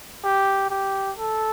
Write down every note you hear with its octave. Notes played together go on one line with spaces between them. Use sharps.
G4
G4
A4